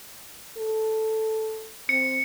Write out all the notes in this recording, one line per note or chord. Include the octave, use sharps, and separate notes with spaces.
A4
C4 C#7